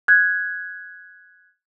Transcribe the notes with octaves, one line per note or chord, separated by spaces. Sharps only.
F#6 G#6